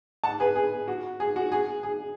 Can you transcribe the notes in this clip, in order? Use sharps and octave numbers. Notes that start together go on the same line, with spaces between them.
F#5 A5
G#4 B4
G#4
F#4
G#4
F#4
G#4
G#4